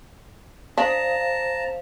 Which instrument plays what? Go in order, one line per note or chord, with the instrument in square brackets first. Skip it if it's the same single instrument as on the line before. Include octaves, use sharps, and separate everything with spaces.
[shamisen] D4 [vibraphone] C5 [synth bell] F5 [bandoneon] A5 A#5